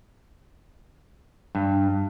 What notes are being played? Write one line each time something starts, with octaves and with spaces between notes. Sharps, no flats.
G2